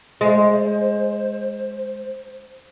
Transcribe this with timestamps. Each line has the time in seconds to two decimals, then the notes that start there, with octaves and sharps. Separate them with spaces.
0.21 G#3 C5